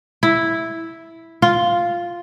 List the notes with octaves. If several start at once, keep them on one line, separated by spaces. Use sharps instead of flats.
E4
F4